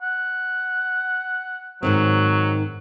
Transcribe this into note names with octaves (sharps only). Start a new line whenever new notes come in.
F#5
G#2 D#3 F#3 C4